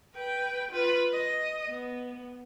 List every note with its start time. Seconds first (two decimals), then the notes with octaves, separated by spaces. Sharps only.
0.14 B4 G5
0.71 F4 B4
1.13 D#5
1.68 B3